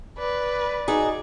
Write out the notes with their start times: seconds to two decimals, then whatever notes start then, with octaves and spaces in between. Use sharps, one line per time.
0.19 B4 D5
0.88 D#4 F#4 G#4